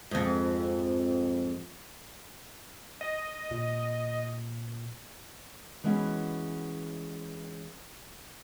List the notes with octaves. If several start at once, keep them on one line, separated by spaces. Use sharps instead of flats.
F2 G#2
D#5
A#2
E3 G#3 B3 C#4 F#4